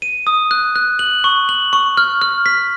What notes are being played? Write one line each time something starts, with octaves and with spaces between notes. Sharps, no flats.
D#7
D#6
F#6
F#6
F#7
C#6
F#7
C#6
F6
F6
B6